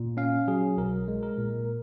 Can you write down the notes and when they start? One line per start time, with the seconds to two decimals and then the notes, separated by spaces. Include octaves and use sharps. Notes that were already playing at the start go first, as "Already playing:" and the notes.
Already playing: A#2
0.17 C#4 F5
0.48 F#3 G#4
0.77 B1 A#4
1.08 G#3
1.23 A#4
1.38 A#2